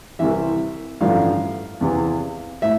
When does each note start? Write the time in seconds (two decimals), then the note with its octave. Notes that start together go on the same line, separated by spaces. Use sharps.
0.19 C2 C3 E3 E5
1.01 A1 G2 D3 F3 F5
1.81 E2 C3 E3
2.62 A2 E5